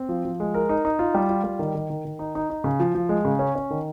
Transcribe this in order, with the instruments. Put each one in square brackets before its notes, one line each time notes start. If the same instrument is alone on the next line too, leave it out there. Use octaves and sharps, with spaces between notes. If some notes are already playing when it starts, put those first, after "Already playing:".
Already playing: [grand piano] C4
F3
F3
G#3
A#4
D#4
D#4
F4
G3
F4
G3
D#3
D#3
D#3
D#3
D#4
D#4
D#4
C#3
F3
F3
G#3
C#3
C#4
C#4
D#3